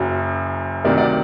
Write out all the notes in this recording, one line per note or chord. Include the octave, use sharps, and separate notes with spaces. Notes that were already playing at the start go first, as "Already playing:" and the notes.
Already playing: F#1 F#2 F#3
D2 C3 D#3 F#3 A#4 D5
D5 F#5